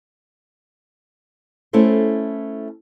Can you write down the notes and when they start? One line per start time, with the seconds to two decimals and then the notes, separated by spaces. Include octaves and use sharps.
1.73 A3 C#4 E4 A4 C5